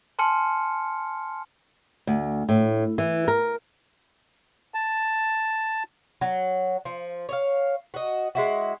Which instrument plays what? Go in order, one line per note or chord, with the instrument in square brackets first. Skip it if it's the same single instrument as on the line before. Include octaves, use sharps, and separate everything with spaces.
[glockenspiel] G#5 A5 C6 F6 C#7
[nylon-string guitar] D2
A2
E3
A#4
[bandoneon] A5
[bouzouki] F#3
F3
C#5 D#5 F5
F#4 D#5
G#3 E4 F#4